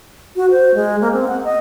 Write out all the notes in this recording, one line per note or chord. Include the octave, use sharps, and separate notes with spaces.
F#4
C5
G#3
A#3
C4
F#5
D#5